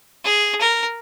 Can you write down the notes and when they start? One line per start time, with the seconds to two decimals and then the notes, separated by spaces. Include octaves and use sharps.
0.25 G#4
0.61 A#4